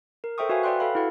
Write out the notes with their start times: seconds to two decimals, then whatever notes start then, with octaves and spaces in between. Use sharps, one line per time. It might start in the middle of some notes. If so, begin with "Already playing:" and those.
0.24 A#4
0.38 A4 C5 E5 G5 C#6 D#6
0.49 F#4 B4 C#5 E5 F5 G#5
0.63 B4 D5 G5 C6 F#6
0.80 A4 B4 F5 B5
0.95 E4 F#4 A4 F#5